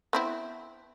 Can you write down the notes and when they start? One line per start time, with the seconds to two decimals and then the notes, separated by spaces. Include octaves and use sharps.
0.13 B3 C4 E4